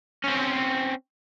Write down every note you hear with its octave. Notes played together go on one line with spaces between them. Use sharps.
C4 C#4